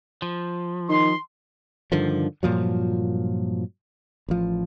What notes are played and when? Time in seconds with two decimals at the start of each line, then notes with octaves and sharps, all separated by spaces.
0.22 F3
0.89 D#3 C6
1.92 G2 D3 D#3 F3
2.43 G2 A#2 F3 F#3
4.29 A1 F3